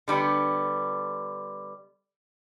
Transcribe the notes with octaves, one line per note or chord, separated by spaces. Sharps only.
D3 G3 B3